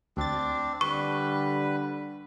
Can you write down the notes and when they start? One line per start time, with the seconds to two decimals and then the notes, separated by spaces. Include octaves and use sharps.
0.17 D2 C4 D4 A6
0.81 D3 G3 B4 C#6